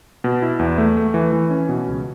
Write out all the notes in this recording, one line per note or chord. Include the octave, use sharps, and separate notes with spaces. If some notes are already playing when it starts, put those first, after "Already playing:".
B2
E4
E2
A3
A3
E3
E3
C#4
B2
C#2